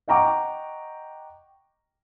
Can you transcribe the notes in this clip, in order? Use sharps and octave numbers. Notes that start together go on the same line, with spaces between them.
D#5 F#5 G5 A#5 C#6 D6